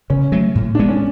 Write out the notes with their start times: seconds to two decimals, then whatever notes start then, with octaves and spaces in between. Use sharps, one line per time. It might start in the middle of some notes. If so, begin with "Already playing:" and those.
0.10 C#3 C#4
0.32 F#3 A3
0.55 A2
0.75 G#3 B3 D4
0.88 C#4